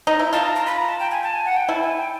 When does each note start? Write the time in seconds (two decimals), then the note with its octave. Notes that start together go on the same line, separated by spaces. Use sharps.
0.07 D#4
0.19 E4
0.33 F4 A5
0.44 A#5
0.56 A#5
0.66 B5
0.78 A#5
0.88 A5
1.00 G5
1.11 G#5
1.23 A5
1.34 G#5
1.46 F#5
1.57 G5
1.68 E4 A5
1.82 G#5
1.98 G5